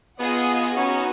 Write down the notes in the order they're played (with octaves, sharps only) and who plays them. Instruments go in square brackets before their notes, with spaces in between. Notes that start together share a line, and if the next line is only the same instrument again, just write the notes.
[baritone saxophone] B3 [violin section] F4 G#4 D#5 F#5
[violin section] B3 D#4 F#4 [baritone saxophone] C#4